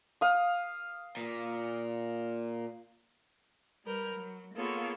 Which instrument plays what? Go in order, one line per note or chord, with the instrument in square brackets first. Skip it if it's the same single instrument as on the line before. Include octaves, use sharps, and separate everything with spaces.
[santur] F5 D#6
[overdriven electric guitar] A#2
[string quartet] G3 A#4 B4 G6
F#3
A#3 B3 F4 G#4 A4 C#5